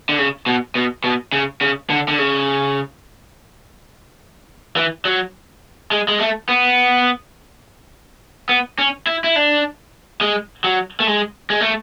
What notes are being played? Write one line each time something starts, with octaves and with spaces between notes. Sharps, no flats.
D3
C#3
B2
B2
B2
C#3
C#3
D3
D3
C#3
E3
F#3
G#3
G#3
A3
B3
B3
C#4
E4
E4
D4
G#3
F#3
A3
G#3
G#3
A3